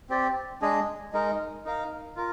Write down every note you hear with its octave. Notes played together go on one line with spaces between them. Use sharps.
C4 G4 D5
G#3 D4 G#4 D#5
G#3 D#4 A#4
D#4 A#4 F5
F4 A#4